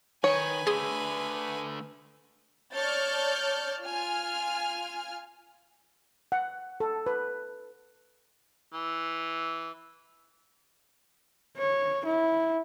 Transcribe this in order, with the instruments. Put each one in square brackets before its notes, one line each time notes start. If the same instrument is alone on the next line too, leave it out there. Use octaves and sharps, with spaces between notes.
[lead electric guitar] D#3 [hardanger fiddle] B4 G#5 [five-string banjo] C#5
[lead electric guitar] D3 A3 [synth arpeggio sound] G#4 C6 D#6
[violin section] C#5 D5 A5 F6 G6 A6
F4 G#5 F6
[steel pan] F#5
A4
B4
[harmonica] E3
[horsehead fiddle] C#5
E4